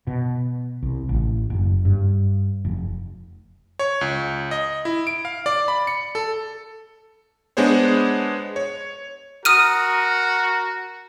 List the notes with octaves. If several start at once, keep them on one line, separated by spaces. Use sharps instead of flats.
B2
C2
A1
F#1
G2
F1
C#5
C#2
D#5
E4
D7
F5
D5
B5
C#7
A4
G#3 B3 D4 G#4 C5 C#5
C#5
F#4 A#4 D#6 F6 D#7